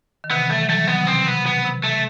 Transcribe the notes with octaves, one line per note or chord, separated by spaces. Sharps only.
D#3
C3 E3 B3
E3 G3 A3
F#3
E3 G3 A3
D#3 F#3 B3
C3
B2 C4
C3 B3
B2 B3
C3
C3 A3